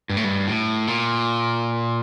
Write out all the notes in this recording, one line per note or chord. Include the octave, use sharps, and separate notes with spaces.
G2
A2
G2
A2
A#2